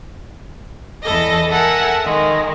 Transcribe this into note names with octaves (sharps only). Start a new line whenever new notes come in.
E2 E3 A4 D#5 A#6
A4 A#4 E5 F#5 G#5
D#3 G#3